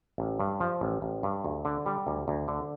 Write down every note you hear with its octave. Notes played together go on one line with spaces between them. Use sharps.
A1
G2
F3
A1
A1
G2
D2
D3
G3
D2
D2
D3